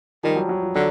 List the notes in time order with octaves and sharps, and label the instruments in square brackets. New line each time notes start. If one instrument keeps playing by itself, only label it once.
[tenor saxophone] D#3 [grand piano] F3 G3
[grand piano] F#3
F#3
F3
[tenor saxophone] D3 [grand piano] F#3